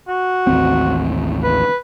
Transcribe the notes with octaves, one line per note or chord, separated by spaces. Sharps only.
F#4
A1 D#2 C4
B4